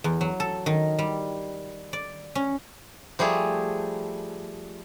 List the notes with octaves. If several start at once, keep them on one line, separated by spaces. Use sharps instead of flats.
E2
F#3
A4
D#3
G3
D5
C#4
F3 G3 A3 G#4